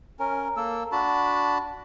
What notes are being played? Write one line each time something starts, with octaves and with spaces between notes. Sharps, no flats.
C#4 A#4
A#3 A4 E6
D4 F#4 A5 B5